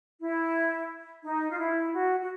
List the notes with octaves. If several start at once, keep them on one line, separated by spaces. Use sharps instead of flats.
E4
D#4
F4
E4
F#4
F#4